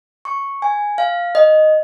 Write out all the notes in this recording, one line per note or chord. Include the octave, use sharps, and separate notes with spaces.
C#6
G#5
F5
D#5